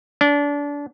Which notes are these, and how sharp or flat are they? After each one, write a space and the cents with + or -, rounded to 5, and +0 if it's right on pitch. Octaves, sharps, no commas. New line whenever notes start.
D4 -30